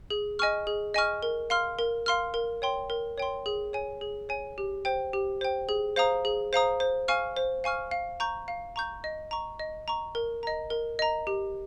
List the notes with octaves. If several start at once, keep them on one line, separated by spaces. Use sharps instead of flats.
G#4
D#5 G#5 C#6 F6
G#4
D#5 G#5 C#6 F6
A#4
F5 C6 F6
A#4
F5 C6 F6
A#4
C#5 G5 C6
A#4
C#5 G5 C6
G#4
C#5 G#5
G#4
C#5 G#5
G4
C5 G5
G4
C5 G5
G#4
C5 F5 A#5 D#6
G#4
C5 F5 A#5 D#6
C5
F5 G#5 C#6 F6
C5
F5 G#5 C#6 F6
F5
A#5 C#6 G6
F5
A#5 C#6 G6
D#5
A#5 C#6
D#5
A#5 C#6
A#4
D#5 A#5
A#4
D#5 A#5
G4